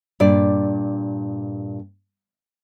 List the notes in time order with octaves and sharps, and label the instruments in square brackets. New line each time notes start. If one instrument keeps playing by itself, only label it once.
[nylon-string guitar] G2 A#2 D5